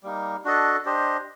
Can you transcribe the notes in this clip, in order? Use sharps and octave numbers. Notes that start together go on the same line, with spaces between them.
G3 A#3 D#4
D4 F#4 A4 D#5
D4 G4 C5 D#5